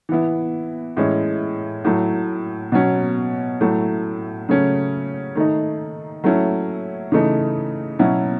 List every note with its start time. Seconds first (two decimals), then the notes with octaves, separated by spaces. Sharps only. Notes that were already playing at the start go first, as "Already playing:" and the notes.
0.09 E3 B3 E4
0.97 A2 E3 G#3 C#4 E4
1.85 A2 F#3 A3
2.72 B2 F#3 C#4
3.61 A2 F#3 A3
4.49 C#3 F#3 A3 C#4
5.35 D#3 A3 D#4
6.24 F#3 A3 C#4 E4
7.12 C#3 E3 A3 D#4
7.99 B2 F#3 C#4 E4